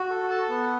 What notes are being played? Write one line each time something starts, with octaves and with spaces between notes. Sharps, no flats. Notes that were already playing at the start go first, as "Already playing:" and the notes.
Already playing: F#4
A4
A4 A5
B3